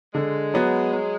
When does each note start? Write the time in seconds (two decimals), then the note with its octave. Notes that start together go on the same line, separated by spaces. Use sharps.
0.15 D3 G#3
0.54 F#3 B3 F#4
0.93 F#3